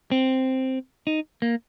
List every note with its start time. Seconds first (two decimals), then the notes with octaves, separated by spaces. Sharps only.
0.11 C4
1.07 D#4
1.42 A#3